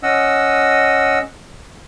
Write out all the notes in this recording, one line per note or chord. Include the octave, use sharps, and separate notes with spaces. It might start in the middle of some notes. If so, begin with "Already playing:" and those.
C#4 D#5 F#5 E6